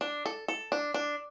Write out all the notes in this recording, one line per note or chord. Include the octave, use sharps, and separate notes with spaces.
D4
A4
A4
D4
D4